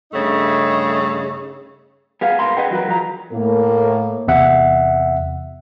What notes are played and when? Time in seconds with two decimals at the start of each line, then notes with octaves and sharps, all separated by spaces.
0.12 G2 C#3 A3 D#4
2.21 B3 G#4 F5
2.39 G#2 B2 A#4 F5 B5 C6
2.57 G#4 B4 D#5 F#5 G5
2.71 E3 F#3 F#4 A#4 B4
2.88 F3 A#5
3.32 A2 A#3
4.28 E2 C3 E5 F#5